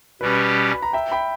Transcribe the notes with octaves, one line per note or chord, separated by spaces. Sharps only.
B2 G3 C#4 G4 B4
B5
A#5
E5 G5
G5 B5